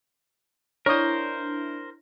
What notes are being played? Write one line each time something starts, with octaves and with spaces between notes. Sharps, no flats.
D4 E4 A#4 C5 C#5 D#6